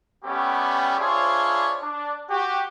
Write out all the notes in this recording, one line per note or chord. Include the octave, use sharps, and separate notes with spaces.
G3 A3 B3 C#4 G4
D4 E4 F4 G#4 C5 C#5
D4
F#4 G4